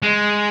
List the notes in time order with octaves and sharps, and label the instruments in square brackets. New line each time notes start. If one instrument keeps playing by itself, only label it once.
[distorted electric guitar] G#3